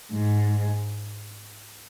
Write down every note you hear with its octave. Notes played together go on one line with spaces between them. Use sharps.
G#2